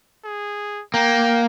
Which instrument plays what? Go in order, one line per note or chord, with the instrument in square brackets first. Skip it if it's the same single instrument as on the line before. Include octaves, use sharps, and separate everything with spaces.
[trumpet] G#4
[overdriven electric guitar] A#3 [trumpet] G5